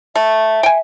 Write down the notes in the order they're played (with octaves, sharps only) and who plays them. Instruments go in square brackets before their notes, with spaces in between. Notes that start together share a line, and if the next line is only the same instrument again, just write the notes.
[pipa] A3 [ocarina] E5
[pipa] G5 G#5